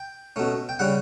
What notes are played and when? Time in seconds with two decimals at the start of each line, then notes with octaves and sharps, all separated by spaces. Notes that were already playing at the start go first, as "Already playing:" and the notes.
Already playing: G5
0.36 B2 A3 C#4
0.69 G5
0.79 C#3 G3 C#4 F#5